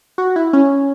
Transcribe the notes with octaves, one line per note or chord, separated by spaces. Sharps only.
F#4
E4
C#4